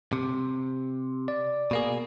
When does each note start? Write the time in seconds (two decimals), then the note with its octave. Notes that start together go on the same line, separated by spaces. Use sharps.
0.13 C3
1.28 D5
1.71 B2 A#3 G#4